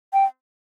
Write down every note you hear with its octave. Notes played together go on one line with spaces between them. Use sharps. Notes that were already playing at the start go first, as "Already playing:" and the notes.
G5